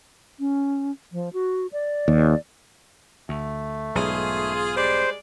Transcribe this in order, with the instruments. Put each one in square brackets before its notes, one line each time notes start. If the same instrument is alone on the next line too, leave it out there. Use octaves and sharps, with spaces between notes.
[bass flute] C#4
F3
F#4
D5
[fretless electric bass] D#2
[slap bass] D2 [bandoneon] A3
[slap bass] B1 G#2 [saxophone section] F4 G#4
[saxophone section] G3 G#3 D5 [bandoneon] C5